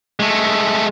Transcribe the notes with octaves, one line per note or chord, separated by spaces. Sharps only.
G#3 A3